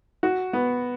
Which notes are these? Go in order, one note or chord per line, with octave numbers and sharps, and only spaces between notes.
F#4
B3